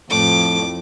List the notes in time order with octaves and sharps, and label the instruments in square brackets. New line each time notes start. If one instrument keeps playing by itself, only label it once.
[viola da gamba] F2 [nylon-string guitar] A2 [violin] D6